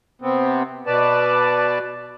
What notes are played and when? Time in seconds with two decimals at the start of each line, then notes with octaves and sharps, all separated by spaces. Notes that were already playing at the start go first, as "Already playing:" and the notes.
0.22 C3 B3 C4
0.87 B2 B4 D5 A5